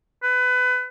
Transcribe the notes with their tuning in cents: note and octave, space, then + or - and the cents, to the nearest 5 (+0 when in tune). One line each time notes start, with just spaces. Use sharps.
B4 +25